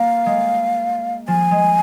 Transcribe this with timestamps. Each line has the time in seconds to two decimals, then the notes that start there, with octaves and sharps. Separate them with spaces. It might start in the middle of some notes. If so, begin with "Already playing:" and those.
Already playing: A#3 F5
0.26 G#3
1.28 F3 G#5
1.51 G#3